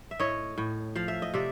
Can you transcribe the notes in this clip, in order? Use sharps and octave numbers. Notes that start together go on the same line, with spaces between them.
E5
A2 C#5 D#5
A2
F3 F5
E5
D#5
C3 D5 E5